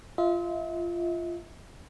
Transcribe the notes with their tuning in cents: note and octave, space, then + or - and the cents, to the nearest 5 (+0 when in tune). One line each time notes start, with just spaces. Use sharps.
F4 -15 E5 -45